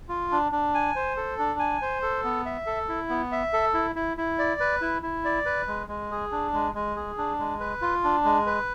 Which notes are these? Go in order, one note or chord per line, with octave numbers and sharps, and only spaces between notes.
F4
D4
D4
G#5
C5
A4
D4
G#5
C5
A4
B3
E5
A4
E4
B3
E5
A4
E4
E4
E4
D5
B4
E4
E4
D5
B4
G#3
G#3
G#4
D4
G#3
G#3
G#4
D4
G#3
B4
F4
D4
G#3
B4